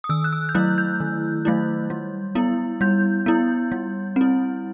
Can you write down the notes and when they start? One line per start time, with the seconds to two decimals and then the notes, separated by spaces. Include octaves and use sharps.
0.04 D#6
0.09 D#3 E6
0.24 F#6
0.33 E6
0.49 G6
0.55 F#3 A3 E4 F#6
0.78 G6
1.00 D#3
1.45 F#3 A3 E4
1.90 G3
2.35 B3 E4
2.81 G3 G6
3.26 B3 E4
3.72 G3
4.16 C4 E4